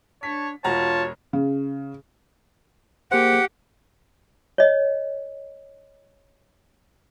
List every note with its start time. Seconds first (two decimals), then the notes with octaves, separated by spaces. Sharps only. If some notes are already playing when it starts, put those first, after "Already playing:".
0.23 D4 C#5 A5 B6
0.64 E1 F4 F#4 C#5 A5 A#5
1.33 C#3
3.11 A#3 G4 G#4 C5 F#5
4.58 C#5 D#5